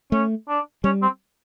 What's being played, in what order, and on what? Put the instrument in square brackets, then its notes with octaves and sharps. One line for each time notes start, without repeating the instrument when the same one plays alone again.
[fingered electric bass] A3 [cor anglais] C#4
[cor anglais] D4
[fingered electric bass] G3 [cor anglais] C#4
[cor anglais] C4